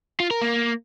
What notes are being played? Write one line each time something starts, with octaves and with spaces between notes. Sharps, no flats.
F4
A#4
A#3